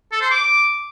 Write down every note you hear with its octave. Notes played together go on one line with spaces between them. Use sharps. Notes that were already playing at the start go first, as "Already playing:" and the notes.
A4
C5
D6